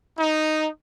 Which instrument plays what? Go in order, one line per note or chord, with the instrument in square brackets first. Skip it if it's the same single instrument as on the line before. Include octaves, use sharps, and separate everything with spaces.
[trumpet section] D#4